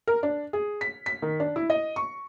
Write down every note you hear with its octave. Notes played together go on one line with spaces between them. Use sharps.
A#4
D4
G#4
B6
B6
D#3
D4
E4
D#5
C#6